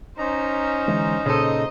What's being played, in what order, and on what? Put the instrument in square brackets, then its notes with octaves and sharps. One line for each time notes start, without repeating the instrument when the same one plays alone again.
[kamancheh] C#4 C5 [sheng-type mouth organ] D#4 A#5
[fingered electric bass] D3 E3 G#3
[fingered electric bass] A#2 [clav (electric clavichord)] C#3 A4 [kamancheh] C5 D#5